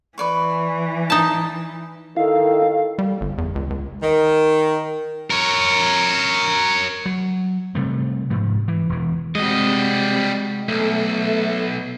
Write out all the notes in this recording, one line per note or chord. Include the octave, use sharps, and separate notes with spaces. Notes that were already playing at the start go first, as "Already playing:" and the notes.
E3 B4 D5 C#6
D#4 A5
D#3 E4 A4 F5
G3
G1
E2
C#2
C#2
D#3
A#4 C#5
F#3
C3 G3 A3
G#2 F3
E3
E1 E3
C3 G3 G#3 F#4 D#5
B1 A3 A4 E5